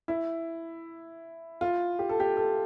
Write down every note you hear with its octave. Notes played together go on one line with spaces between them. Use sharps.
E4
F4
G4
A4
G4
A4